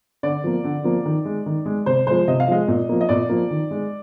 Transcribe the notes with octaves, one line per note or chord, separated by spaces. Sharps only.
D3 D5
F3 A#3
D3
F3 A#3
D#3
G#3
D#3
G#3
C3 C5
F3 G#3 C5
C3 D#5
F5
F3 G#3 D#5
A#2
F3 A#3
D#5
A#2 D5
F3 A#3
D#3
G#3